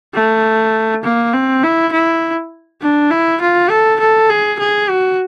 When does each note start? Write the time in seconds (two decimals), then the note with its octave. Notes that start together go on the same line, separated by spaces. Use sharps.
0.14 A3
1.03 A#3
1.33 C4
1.63 E4
1.92 E4
2.81 D4
3.11 E4
3.41 F4
3.70 A4
4.00 A4
4.30 G#4
4.59 G#4
4.89 F#4